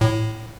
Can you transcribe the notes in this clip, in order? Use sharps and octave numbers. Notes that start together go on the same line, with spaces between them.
A2